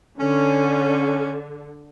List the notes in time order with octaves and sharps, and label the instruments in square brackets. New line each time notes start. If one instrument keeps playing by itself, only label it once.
[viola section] D3 [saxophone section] C#4